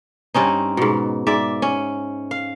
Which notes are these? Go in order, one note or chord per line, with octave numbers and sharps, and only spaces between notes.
G2 C4 C#4 D#4
G#2 B2
G#2 D5 E5
C#4
F5